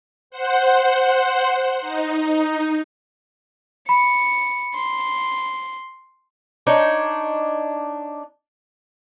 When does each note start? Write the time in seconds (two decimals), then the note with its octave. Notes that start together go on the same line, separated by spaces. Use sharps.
0.30 C5 F#5
1.81 D#4
3.89 B5 C#7
4.75 C6
6.67 D4 D#4 C#5